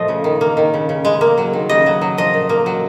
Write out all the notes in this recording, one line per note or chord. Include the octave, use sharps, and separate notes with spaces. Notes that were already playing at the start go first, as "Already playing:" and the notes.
Already playing: A#2 F3 A3 D#5
C#3
D#3
A#3
D#3
C#3
C#3
G#3
A#3
F#3
D#3
C#3 D#5
F#3
F#3
F3 D#5
A#2
A#3
F#3